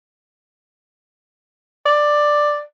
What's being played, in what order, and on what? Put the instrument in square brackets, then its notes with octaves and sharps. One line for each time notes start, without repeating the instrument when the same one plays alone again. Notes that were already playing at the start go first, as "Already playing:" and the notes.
[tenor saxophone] D5